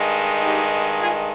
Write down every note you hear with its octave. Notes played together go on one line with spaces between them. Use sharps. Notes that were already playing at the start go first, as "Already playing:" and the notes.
Already playing: G2 D#3 G#3
D#4 G4
F4 G#4